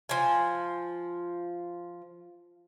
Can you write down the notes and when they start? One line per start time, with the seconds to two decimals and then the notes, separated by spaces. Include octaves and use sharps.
0.09 F3 G#5